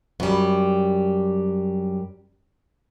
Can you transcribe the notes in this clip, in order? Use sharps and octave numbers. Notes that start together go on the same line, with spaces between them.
F#2 G3